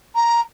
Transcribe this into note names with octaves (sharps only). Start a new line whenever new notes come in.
A#5